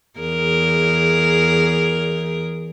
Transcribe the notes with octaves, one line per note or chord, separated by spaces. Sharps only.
E2 G#4 A#4